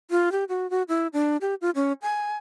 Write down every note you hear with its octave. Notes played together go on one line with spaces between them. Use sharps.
F4
G4
F#4
F#4
E4
D4
G4
F4
C#4
G#5